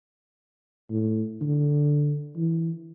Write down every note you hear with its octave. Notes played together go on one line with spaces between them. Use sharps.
A2
D3
E3